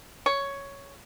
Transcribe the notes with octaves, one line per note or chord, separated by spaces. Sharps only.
C#5